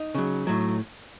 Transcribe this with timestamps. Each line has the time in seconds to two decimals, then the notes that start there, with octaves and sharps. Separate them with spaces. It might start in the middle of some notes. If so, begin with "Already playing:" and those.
Already playing: D#4
0.15 C#3 F#3
0.47 A2 F#3